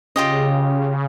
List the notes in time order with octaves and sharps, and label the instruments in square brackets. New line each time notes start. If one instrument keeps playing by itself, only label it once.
[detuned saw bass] C#3 [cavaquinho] F4 G4 D#5